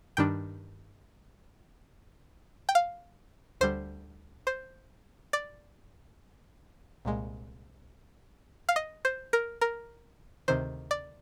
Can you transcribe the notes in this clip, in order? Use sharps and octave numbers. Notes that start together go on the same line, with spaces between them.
G2 D#3 G3 D4 G5
G5
F5
D2 D3 G3 C5
C5
D5
C2 A#2 G#3
F5
D#5
C5
A#4
A#4
D2 C3 D#3 C5
D5